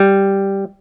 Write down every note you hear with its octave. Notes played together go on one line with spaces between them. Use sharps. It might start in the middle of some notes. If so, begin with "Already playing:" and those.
Already playing: G3